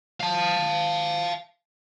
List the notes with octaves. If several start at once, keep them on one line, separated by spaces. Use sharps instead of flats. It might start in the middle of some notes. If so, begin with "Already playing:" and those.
F5 A5